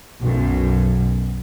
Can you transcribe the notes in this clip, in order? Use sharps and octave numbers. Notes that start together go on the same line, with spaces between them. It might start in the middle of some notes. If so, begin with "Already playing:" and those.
B1 F#2